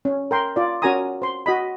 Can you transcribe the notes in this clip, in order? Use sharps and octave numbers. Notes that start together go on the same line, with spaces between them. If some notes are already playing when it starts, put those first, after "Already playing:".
C#4
A#4 G5 C6
F4 D5
C#4 F#4 A#4 G#5 A#5 D#6
C5 C6
F#4 D#5 B5